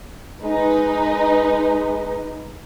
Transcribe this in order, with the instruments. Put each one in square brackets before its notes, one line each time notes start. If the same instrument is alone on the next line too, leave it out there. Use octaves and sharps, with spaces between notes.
[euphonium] G#3 [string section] D#4 B4